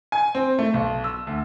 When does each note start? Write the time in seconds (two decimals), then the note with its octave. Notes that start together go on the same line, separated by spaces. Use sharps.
0.12 G#5
0.35 C4
0.59 A3
0.74 B1
1.04 E6
1.27 D2